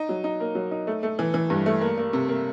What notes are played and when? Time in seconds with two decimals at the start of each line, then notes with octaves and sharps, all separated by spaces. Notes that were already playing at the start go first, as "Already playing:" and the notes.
Already playing: D#4
0.09 F#3
0.24 D#4
0.40 A#3
0.55 F#3
0.71 D#4
0.87 A3
1.03 A3
1.19 E3
1.34 E3
1.50 G2
1.66 A3
1.81 A#3
1.98 A#3
2.13 C3
2.28 A#3